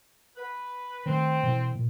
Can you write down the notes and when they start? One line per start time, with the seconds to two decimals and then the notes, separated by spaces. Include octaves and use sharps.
0.36 B4
1.06 D#3 A3 C4
1.43 B2 E3
1.75 A#2